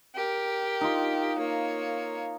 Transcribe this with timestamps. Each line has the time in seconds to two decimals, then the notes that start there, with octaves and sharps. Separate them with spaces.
0.15 G4 A#4
0.81 D#4 F4
1.38 A#3 C#5